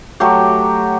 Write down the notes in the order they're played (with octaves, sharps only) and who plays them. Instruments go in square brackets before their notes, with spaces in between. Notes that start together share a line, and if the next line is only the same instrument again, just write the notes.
[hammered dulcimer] F#3 A3 G4